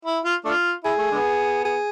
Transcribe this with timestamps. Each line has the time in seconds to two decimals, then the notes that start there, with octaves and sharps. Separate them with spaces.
0.05 E4
0.25 F4
0.45 A3 D4 F4
0.84 E4 G#4
0.98 A3
1.12 D3 G#3 B3
1.65 G#4